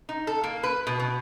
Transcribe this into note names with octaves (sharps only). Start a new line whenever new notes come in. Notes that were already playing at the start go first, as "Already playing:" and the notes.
D#4
A4
A#3
B4
B2
B2